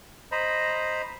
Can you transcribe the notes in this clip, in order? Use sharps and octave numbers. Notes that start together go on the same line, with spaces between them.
C5 D#5 A#5 B5